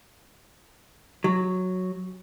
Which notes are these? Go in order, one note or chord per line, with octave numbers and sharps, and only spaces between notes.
F#3